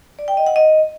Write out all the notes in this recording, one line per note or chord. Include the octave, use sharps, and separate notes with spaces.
D5
G5
D#5
F#5
D#5